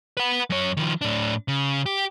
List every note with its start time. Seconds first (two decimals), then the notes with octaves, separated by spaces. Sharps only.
0.17 B4 F#5
0.50 F#2 C#5
0.77 D#3 F3
1.01 A2 D4
1.48 C#3
1.86 G4